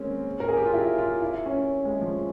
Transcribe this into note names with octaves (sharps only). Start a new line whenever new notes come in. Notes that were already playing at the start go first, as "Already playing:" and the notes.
Already playing: G#3 A#3 C4 C#4
A#4
G#4
G4
F4
E4
F4
E4
C#4
G#3
F3